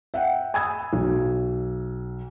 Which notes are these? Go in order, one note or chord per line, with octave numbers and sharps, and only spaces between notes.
E5 F#5 G5
G#5 B5 D#6 E6 G#6
B1